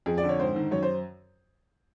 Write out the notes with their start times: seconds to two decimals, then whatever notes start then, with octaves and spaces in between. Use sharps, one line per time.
0.06 F2 G#4
0.18 D5
0.23 D3
0.29 C#5
0.39 G#2 C5
0.56 D#3
0.71 F#2 C#5
0.83 C5